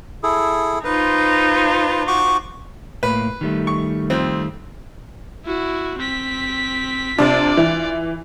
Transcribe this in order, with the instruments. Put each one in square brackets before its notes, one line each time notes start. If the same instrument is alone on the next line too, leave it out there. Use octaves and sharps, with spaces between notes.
[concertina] E4 G#4 A4
[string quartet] D#4 F4 C5 [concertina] B4
[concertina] F#4 C#6 D6
[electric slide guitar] A2 A#3 [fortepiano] B4
[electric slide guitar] D#3 G3 A3
[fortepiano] C#6
F2 C4
[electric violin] E4 F#4
C4 B6
[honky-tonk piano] C3 D4 [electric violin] F4 D5
[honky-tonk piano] E3